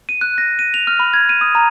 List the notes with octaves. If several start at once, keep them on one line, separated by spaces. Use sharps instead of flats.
D#7
F#6
A#6
D#7
F7
F6
B5
G#6
D#7
D#6
A#5